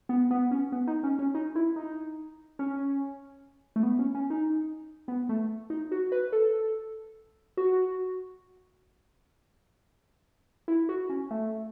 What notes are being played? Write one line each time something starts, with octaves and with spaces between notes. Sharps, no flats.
B3
B3
C#4
B3
D#4
C#4
C#4
D#4
E4
D#4
C#4
A3
B3
C#4
C#4
D#4
B3
A3
D#4
F#4
B4
A4
F#4
E4
F#4
C#4
A3